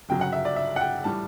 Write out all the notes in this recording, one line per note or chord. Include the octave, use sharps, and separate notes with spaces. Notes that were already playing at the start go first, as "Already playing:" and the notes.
G1 F#2 C#3 F#3 G5
F#5
E5
D5
E5
F#5
G5
A2 E3 G3 A5